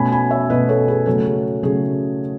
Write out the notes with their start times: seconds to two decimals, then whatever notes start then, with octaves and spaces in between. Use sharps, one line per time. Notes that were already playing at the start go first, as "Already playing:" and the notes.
Already playing: B2 A3 C#4 G#5 B5
0.12 G#5 B5
0.30 C#5 E5
0.50 B2 A3 C#4 B4 D#5
0.69 A4 C#5
0.88 G#4 B4
1.06 C#3 F#3 A3 C#4 A4
1.25 G#4
1.63 C#3 F#3 A3 C#4 G#4